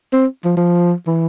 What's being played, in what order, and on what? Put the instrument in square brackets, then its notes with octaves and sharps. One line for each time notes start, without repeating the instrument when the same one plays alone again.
[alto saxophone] C4
F3
F3
E3